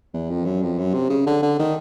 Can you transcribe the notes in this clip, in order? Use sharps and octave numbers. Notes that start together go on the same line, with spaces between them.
E2
F2
F#2
F2
F#2
C3
C#3
D3
D3
D#3